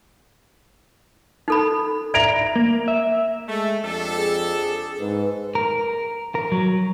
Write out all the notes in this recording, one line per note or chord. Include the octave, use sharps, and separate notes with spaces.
D#4 A4 B5
D5 E5 A#5 D7 F7
A#3
E5
G#3 A3
F2 D4 G4 A4
G#4
G#2 B4
A#4
A#4
F#3